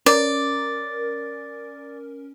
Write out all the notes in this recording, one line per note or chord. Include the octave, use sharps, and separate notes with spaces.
C#4 A#4 D5